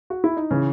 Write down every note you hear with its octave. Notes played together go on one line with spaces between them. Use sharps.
F#4
E4
D#4
C#3 E3 C#4